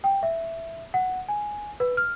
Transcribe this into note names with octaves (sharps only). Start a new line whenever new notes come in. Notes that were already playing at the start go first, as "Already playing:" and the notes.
G5
E5
F#5
G#5
B4
F6